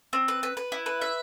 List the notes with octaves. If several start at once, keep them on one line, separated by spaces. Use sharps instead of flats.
C4
B4
B4
B4
E4
B4
E5